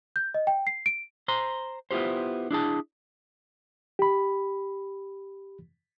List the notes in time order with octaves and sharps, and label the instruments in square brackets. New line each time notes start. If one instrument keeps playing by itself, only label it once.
[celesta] G6
D#5
G5
C7
D7
[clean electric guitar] C5 A#5 C6
B3 E4 F4 G4 C5
D4 E4 G#4 A5
[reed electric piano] G4 B5